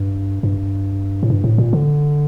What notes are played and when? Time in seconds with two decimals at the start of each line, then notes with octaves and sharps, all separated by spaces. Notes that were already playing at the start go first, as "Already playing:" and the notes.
Already playing: G2
0.43 G2
1.23 A2
1.30 G2
1.44 A2
1.58 A#2
1.73 D3